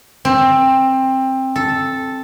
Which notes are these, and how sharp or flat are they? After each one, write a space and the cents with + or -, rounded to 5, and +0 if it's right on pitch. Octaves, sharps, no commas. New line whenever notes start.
C4 +15
A4 -5